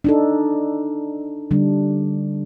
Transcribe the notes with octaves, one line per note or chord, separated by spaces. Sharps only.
D4 D#4 A4
D3 G3 D4